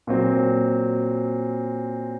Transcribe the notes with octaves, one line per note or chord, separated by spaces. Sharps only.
A#2 F#3 C4